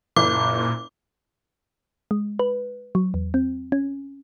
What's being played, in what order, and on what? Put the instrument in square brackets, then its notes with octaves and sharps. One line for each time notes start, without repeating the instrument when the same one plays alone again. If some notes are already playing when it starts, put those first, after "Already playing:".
[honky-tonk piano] F#1 [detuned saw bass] A#2 [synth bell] D6
[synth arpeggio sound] G#3
B4
F#3
E2
C4
C#4